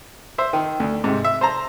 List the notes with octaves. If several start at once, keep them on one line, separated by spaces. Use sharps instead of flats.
C5 E5
D#3
D2
G#2 C3
E5
C5 A5 A#5